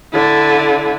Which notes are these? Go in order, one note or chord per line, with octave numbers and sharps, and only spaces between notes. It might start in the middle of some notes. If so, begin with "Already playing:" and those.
D3 E4